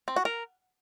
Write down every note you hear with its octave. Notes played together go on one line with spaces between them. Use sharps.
C4
F#4
A#4